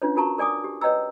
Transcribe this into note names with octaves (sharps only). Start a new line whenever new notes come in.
C#4 D4 F4 B4 C#5
F4 F#4 A#4 A5 A#5 C#6
A#4 D5 G#5 D6 D#6
G4
B4 C#5 D#5 G5 A#5 E6